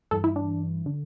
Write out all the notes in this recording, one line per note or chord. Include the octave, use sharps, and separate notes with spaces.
G2 E3 A4
E4
D4
D3